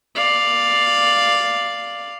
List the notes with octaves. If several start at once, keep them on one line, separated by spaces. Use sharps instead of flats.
D5 F5